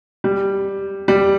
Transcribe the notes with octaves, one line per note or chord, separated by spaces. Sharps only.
G3
G3